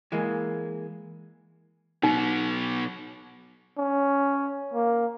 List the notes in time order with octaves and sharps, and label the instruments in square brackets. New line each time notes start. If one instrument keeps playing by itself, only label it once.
[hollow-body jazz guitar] E3 G#3 A#3
[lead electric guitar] B2 F#3 [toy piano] D#4
[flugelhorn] C#4
A#3